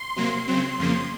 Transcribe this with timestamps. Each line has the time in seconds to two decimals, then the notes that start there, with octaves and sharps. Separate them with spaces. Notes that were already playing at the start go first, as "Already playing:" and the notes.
Already playing: C6
0.16 C3 F#3 A#3
0.47 C#3 F#3 C4 C6
0.79 F2 C#3 F3 A#3